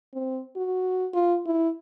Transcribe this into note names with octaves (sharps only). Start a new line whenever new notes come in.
C4
F#4
F4
E4